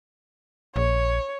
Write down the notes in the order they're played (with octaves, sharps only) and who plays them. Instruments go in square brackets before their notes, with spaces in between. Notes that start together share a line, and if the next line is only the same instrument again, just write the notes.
[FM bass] A#1 [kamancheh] C#5